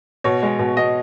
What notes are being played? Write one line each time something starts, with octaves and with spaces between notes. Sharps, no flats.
B2 C#5
G#3
B2
B2 D#5